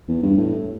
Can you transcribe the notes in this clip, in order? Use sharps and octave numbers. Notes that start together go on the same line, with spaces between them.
E2
G2
A2